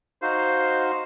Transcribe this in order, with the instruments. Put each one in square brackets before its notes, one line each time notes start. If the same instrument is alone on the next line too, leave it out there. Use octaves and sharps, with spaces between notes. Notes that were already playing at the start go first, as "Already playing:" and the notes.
[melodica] D#4 F#4 F5 [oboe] C5